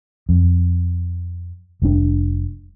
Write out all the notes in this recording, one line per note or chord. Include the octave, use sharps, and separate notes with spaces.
F2
F1 G3 D4